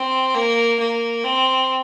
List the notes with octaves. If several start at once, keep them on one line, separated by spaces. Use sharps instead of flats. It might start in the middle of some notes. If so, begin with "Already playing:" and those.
Already playing: C4
A#3
A#3
C4